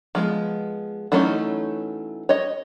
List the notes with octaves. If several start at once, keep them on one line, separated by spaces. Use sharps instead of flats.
F3 G#3 B3
E3 F#3 A3 C#4 D#4
C#5 D#5